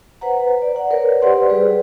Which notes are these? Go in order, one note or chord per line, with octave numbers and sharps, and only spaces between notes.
B4 C5 F#5 A#5
D5
F#5
A#4 B4 C#5 D5
G4 B4 C5 D5 F#5 C6
G3 G#4 B4 D5